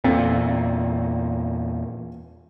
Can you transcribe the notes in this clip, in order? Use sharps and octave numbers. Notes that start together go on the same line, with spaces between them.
E2 A#2 C4 F4 A4